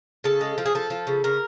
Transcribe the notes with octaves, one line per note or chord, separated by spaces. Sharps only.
C#3 A4
G#3
F3
G#4
F3 A4
F3
C#3
C#3 A#4